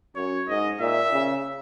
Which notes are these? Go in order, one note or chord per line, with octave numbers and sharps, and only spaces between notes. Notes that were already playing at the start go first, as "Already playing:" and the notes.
F#2 C#5
G#2 D#5
A#2 E5
C#3